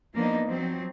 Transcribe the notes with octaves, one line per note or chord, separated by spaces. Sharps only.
F3 A#3 B3 D4 D#4
F3 F#3 C4